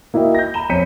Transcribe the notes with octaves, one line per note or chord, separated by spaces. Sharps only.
A#3 E4 F#4 D#5 G5
G6 A#6
A#5 B5 E7 G7
F2 C#5 G6 B6 C#7 D#7